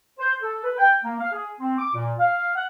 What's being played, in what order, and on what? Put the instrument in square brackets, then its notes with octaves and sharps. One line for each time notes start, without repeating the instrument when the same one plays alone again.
[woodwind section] C5
A4
B4
G5
A#3
F5
G#4
C4
D6
A#2
F5
F#5